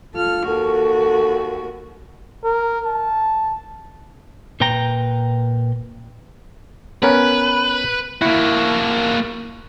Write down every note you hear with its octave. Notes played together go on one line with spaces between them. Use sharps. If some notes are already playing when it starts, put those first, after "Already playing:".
F4 A4 F6
D#2 F#4 A4
A#4
A5
A#2 B4 G5 A#5
B3 C#4 A#4 B4
A#3 E4 F#4